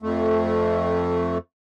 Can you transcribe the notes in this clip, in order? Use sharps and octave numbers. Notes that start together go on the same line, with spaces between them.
F2 A3